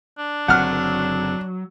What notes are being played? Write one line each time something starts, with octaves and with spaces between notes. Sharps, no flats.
D4
F#1 D3 F#3 C4 F#5 F6